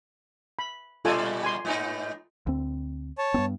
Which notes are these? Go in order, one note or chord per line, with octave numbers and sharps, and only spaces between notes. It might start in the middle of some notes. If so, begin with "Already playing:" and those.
B5
A#2 G3 F4 A4 D5 G#5
G#5 C6
G#2 B3 D#4
D2 C4
C#5 A5
G2 B3 C4